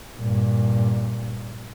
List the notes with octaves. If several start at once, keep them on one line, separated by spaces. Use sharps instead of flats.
G2 A#2